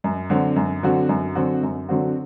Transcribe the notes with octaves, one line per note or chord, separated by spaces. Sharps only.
F#2
D3 F#3 C4 F#4
F#2
D3 F#3 C4 F#4
F#2
D3 F#3 C4 F#4
F#2
D3 F#3 C4 F#4